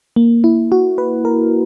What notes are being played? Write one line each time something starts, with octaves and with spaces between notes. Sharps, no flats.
A#3
E4
F#4
B4
A#4